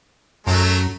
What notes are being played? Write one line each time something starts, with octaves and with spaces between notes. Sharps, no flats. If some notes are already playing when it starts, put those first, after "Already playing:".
F#2 F#3 A3 A#5